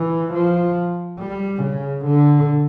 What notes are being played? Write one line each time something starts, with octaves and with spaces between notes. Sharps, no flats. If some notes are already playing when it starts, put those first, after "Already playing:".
Already playing: E3
F3
G3
C#3
D3